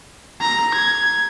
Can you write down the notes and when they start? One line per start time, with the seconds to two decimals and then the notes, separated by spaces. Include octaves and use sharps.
0.41 A#5
0.74 G#6